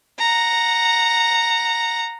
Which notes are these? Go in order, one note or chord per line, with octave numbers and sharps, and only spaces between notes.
F#5 A#5